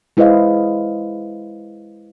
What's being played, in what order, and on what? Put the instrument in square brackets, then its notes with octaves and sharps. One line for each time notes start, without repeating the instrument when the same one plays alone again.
[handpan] G#3 E4 B4 C5 D#5 F5